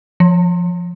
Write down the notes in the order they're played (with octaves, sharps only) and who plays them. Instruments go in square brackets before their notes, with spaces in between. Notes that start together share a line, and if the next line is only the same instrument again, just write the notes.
[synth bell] F3